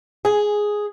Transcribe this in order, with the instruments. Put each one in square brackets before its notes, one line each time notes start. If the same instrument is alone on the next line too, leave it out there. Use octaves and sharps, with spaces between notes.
[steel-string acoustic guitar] G#4